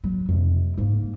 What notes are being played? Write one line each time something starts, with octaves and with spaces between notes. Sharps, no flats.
F#3
F2 C3
G#2 A#3